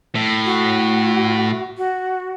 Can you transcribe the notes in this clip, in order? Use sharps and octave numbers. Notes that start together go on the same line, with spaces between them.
A2
F#4
F#4